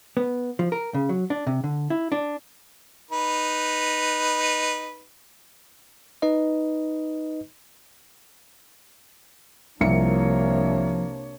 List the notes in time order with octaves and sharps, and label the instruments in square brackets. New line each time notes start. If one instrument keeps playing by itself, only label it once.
[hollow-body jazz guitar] B3
F3
A#4
C#3
F#3
D4
C3
D3
E4
D4
[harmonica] D#4 B4
[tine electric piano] D#4 B4 D#5
[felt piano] C2 C#7 [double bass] C3 A#3 [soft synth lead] F3 [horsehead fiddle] D4 C#5